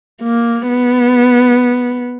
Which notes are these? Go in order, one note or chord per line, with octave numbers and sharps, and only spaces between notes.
A#3
B3